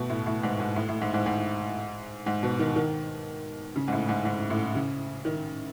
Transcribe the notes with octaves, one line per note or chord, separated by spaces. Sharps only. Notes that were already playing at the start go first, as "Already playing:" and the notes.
Already playing: B2 A3
A2
A2
G#2
G#2
A2
A2
G#2
G#2
G#2
G#2
B2
D#3
D#3
C#3
G#2
A2
G#2
G#2
A2
C#3
D#3